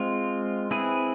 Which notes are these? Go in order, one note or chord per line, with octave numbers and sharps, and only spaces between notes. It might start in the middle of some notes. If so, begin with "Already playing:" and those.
Already playing: G#3 C4 F4
C4 E4 G#4 B4